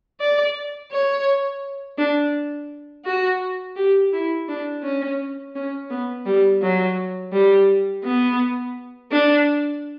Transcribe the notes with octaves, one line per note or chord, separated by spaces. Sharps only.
D5
C#5
D4
F#4
G4
E4
D4
C#4
C#4
B3
G3
F#3
G3
B3
D4